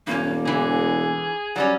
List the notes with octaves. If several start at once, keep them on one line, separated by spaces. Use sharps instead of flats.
E1 G2 A#3 C#4
D3 E3 G#4
F#3 G3 C#4 D5